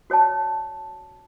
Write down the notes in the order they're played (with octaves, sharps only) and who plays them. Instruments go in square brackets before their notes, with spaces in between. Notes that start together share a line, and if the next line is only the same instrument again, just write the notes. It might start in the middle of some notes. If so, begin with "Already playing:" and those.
[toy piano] F#4 C#5 D5 A5